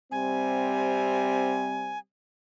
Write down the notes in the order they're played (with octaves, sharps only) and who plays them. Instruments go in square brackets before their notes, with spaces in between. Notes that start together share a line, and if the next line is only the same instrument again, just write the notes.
[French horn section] C3 G3 C4 [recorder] G#5